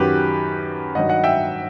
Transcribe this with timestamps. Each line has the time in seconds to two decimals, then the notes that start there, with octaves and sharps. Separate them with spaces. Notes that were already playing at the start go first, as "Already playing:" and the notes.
Already playing: F#2 D#3 F#3 G4 B4
0.95 G2 D#3 F#3 D#5 F#5
1.09 D#5 F#5
1.24 E5 G5